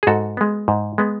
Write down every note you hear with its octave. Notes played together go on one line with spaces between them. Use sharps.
G#4
G#2 F#4 A4
G#3 B3
G#2
G#3 B3